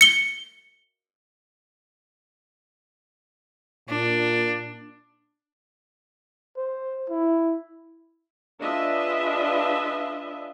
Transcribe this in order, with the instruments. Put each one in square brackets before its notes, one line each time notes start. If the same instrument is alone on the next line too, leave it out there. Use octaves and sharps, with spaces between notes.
[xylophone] C#7 G7
[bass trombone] A#2 [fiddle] D4
[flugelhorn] C5
E4
[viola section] D4 F4 G#4 B4 D#5 E5